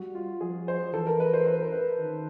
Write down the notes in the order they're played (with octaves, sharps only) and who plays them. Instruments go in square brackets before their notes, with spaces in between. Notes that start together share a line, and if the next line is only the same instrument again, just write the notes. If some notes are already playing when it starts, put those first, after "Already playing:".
Already playing: [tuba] G3 [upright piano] F#4
[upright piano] F4
[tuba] F3 [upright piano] G#4
[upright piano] C5
[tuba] E3 [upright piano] A4
[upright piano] A#4
B4
C5
C5
A#4
B4
[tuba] D#3